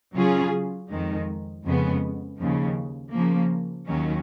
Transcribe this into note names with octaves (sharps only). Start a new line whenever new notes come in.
C#3 F#3 C#4 F4 G#4
F2 D#3 G#3
F2 C#3 G#3 B3
D#2 C#3 F3
C#3 F3 A#3
D#2 D#3 F#3 C#4